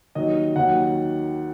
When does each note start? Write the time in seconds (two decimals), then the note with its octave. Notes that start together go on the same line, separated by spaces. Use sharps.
0.15 D#2 D#3 F#3 D#5
0.56 D#2 D#3 F#3 F#5